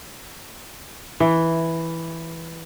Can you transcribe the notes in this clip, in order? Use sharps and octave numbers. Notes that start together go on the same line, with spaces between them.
E3